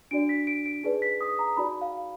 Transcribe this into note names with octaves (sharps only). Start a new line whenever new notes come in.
D4 F#4 D5 D7
B6
D7
D7
D#4 G#4 B4 D5
B6
D#6
A#5
D#4 F#4 D5 B5
F5